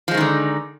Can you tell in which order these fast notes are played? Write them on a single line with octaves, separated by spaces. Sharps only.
F3 G#3 D#3 D#4 D3